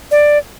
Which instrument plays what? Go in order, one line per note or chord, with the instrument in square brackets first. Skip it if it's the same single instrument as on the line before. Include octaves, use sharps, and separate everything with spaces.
[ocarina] D5